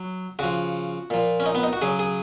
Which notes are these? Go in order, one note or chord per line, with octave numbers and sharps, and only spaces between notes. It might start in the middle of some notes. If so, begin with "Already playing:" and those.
Already playing: F#3
C#3 F3 F#4
A#2 F3
C#4
D#4
B3
D#4
F#4
C#3 F#3 G#4
G#4